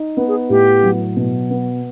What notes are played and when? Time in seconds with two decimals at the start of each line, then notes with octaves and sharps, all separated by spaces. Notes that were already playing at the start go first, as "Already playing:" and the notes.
Already playing: D#4
0.17 B3
0.28 G#4
0.50 A2 G4
0.83 F#3
1.17 B2
1.50 B3